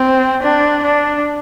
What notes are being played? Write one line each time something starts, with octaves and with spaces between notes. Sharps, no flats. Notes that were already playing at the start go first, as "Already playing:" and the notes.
Already playing: C4
D4
D4